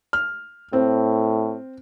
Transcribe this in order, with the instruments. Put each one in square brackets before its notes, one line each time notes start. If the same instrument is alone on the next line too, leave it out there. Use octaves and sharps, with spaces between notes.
[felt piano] F6
[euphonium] A2 [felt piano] C4